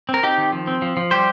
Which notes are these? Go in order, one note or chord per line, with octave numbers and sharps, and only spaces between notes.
C4
A#4
C4 D#4 G4
D#3
F3
C4
F3
F3
G3 G4 C5